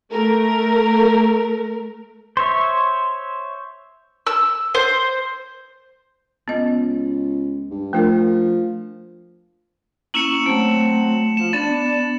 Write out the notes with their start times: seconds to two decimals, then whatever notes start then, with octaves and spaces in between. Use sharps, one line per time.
0.11 A3 A#4
2.37 C5 C#5 E5
4.27 E6
4.75 C5
6.48 C#2 B3 D#5
7.71 G2
7.93 F3 A3 D4 A#4
10.14 A#3 C#4 E4 C#7 E7 F#7
10.46 F#3 A3 C4
11.37 F3 E7
11.53 B3 D4 A6